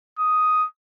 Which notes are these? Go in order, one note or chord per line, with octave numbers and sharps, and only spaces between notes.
D#6